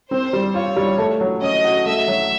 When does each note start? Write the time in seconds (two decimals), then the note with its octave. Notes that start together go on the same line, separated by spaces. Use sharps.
0.11 C4 C5
0.33 G3
0.54 F4 C#5
0.76 G3
0.98 A3
1.21 F#3
1.42 C#4 D#5
1.64 F#4
1.86 A3 E5
2.08 F#3